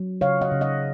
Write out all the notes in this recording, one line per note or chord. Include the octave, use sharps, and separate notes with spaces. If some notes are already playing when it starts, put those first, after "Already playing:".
Already playing: F#3
C#3 C#5 F5
D#5 F#5
C#3
D#5 F#5